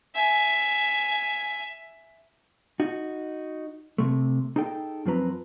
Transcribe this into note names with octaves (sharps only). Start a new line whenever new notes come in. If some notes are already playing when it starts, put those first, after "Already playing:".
E5 G#5
D#4 F#4
C3 A3
D#4 G#4 A4 G5
F#2 F3 C4 B4 A#5